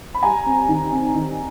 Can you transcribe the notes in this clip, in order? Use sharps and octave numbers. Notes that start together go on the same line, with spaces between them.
B5
G3 G#5 A#5
C4
D#3
C4
D#3